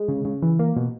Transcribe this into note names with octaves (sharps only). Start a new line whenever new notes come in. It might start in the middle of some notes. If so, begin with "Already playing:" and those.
Already playing: G#3
C#3
C#3
E3
A#3
B2